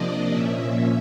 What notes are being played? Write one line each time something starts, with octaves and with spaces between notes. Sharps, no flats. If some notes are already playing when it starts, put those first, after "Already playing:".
Already playing: C3 F3 A#3 D4 D5 D#5
A#2 F3 A#3 C#4 E5